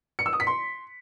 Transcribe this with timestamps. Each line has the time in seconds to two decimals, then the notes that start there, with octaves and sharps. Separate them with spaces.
0.19 C#7
0.26 E6
0.33 D#6
0.40 B6
0.47 C6